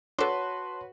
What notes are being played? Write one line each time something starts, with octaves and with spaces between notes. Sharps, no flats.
D4 F#4 A4 B4 C#5 A5 C6